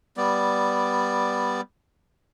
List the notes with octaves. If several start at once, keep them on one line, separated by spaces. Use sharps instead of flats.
G3 B3 D5